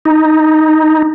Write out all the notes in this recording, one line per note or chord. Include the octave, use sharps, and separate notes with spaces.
D#4